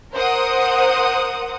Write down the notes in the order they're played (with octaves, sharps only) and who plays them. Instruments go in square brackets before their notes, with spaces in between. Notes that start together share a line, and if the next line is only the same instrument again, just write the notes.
[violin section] A#4 C5 F#5 D#6